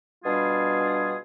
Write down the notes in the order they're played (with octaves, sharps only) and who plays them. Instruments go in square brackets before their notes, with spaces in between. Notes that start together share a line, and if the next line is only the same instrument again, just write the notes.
[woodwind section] B2 G3 D4 F4 G#4